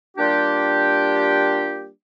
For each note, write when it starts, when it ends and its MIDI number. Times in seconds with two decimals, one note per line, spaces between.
0.17 1.89 55
0.17 1.89 58
0.17 1.89 62
0.17 1.89 65
0.17 1.89 67